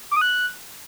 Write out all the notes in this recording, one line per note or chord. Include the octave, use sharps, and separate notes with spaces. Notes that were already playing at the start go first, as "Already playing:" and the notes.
D6
D#6
F#6